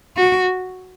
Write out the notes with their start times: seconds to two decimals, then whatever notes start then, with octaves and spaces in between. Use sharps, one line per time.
0.17 F#4